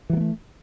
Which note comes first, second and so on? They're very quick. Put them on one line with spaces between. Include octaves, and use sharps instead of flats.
E3 F#3 A#3 A3